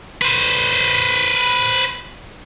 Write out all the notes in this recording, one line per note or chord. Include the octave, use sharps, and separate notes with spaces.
B4 C5